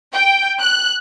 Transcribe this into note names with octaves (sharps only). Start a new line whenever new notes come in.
G5
F#6